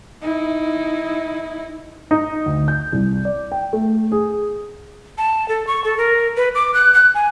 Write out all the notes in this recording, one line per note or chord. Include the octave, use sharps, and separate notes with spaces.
D#4 E4
D#4
D2
G6
C2
D5
G5
A3
G#4
A5
A4
C#6
A4
A#4
B4
D6
F#6
F#6
G#5